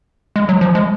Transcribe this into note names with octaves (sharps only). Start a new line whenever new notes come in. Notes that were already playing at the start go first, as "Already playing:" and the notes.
G#3
F#3
F3
G#3